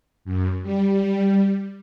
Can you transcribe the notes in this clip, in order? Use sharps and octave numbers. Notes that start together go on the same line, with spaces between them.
F#2
G3